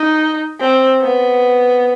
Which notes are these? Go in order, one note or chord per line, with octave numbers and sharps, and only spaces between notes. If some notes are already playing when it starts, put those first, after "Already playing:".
Already playing: D#4
C4
B3